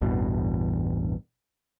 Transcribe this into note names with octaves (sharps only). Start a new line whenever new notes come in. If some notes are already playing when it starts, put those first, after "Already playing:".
A1 E2 G2 B2